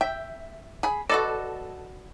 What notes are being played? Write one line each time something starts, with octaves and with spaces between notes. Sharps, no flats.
E5 G5
G#4 B5
F#4 A4 B4 D5 D#5 A5